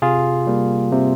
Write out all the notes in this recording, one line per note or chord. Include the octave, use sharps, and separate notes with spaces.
C3 F4 G#4
G3 A#3
C3